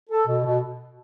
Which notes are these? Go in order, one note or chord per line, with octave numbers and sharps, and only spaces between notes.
A4
B2
B2